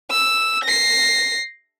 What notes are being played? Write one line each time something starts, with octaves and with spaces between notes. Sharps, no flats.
E6
A#6 C7